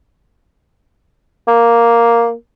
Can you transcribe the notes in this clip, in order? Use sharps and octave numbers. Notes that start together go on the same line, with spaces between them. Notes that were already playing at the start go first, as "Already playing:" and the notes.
A#3